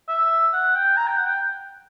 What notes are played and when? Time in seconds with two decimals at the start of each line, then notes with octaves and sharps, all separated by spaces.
0.08 E5
0.53 F#5
0.76 G5
0.97 A#5
1.07 G5
1.17 F#5
1.26 G5